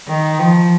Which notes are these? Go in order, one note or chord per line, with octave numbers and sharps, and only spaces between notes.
D#3
F3